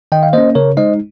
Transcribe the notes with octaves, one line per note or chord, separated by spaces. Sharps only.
D#3 D#5 G5
F5
A#3 C#4 C5 D#5
C#3 A#4 C#5
G#3 D#4 C5 D#5